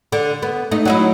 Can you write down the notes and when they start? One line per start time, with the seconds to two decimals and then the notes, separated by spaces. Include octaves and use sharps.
0.12 D3
0.42 B3
0.71 A3 D#4
0.85 F#3 D#4 E4